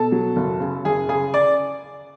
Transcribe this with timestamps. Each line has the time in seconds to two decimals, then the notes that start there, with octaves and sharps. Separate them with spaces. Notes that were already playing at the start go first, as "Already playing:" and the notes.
Already playing: B2 A4 A5
0.12 F#3
0.36 F#1
0.60 C#3
0.85 F#1 G#4 G#5
1.09 C#3 G#4 G#5
1.34 D5 D6